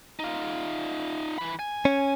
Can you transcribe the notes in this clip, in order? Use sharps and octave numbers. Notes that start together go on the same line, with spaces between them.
D#4 F4
E3 B5
G#5
C#4